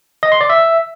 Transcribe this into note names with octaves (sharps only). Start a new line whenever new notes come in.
D#5
C6
D5
E5